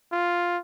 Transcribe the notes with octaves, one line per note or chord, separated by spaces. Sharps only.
F4